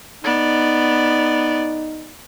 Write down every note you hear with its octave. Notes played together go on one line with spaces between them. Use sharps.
B3 D#4 D5